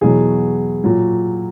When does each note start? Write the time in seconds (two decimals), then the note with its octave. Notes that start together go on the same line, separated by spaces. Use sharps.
0.01 E2 B2 F#3 G#4
0.84 A#2 F#3